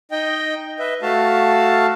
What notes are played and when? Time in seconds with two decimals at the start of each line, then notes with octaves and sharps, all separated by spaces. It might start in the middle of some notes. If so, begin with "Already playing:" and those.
0.12 D#4 D#5 G5
0.79 B4 D#5 E5
1.02 A3 F#4 F5 A5